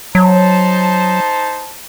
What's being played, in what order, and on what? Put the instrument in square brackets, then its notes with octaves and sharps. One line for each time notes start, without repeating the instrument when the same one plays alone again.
[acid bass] F#3 [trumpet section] D#4 C5 A5